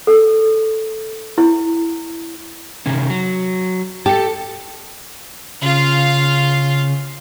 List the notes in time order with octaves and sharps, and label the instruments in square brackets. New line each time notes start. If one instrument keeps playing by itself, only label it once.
[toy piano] A4
E4
[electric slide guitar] C3 D#3 C#4
F#3
[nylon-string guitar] G4 [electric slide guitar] A4 A5
[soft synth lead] C#3 [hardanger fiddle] F4 F5